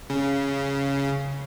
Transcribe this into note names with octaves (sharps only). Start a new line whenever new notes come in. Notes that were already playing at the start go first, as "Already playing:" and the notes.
C#3